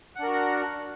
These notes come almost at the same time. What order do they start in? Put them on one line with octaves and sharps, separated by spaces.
F#5 D4 A#4 F#4